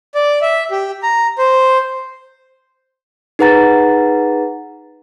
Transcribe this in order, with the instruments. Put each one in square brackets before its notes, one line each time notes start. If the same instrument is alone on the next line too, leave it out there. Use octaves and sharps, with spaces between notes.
[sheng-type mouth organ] D5
E5
G4
A#5
C5
[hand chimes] D#4 G#4 B4 F#5 A#5 A6